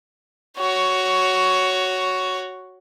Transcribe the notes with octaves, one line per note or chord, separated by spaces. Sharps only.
F#4 C#5